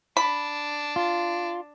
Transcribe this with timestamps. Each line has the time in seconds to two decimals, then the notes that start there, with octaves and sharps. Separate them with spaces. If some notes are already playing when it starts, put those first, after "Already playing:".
0.17 D4 B5
0.96 F4